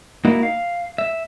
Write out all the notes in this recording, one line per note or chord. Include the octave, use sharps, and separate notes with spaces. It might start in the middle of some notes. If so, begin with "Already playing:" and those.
A#3 D#4 E4 F#4
F5
E5